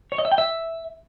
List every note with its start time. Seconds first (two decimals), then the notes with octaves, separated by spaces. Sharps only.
0.12 C#5
0.18 D#5
0.25 E5
0.32 G5
0.38 E5